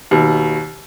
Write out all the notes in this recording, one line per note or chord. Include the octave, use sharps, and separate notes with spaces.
D#2 B2